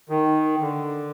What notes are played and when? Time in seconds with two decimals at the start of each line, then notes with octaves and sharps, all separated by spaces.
0.09 D#3
0.61 D3